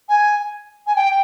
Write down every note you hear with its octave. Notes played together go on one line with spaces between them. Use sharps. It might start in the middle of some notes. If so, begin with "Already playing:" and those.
G#5
G#5
G5